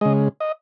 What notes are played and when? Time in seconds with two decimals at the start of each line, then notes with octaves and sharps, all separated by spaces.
0.01 C#3 G#3 D#5
0.40 D#5